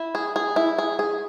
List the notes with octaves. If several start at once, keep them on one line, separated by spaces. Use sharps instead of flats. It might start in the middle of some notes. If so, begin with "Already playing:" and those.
Already playing: E4
G#4
G#4
E4
G#4
G#4